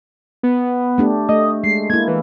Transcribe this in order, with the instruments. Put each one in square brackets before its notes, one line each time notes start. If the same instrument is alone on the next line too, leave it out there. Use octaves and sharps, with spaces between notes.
[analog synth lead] B3
[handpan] A3 D4 G4
[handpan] A3 [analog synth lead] D#5
[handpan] G#3 [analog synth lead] C7
[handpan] A#3 E4 [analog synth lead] G#6
[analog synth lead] E3